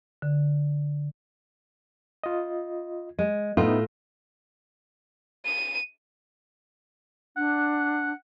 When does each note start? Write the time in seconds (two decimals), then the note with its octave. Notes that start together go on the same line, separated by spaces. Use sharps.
0.22 D3
2.24 F4 D#5
3.19 G#3
3.57 A2 B3 D#4 F4 E5
5.45 D#7
7.37 D4 F#5